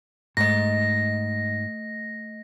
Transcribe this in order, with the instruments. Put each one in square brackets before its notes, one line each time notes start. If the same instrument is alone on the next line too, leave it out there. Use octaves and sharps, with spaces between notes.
[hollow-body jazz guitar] G#2 [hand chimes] A3 D#5 [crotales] A#6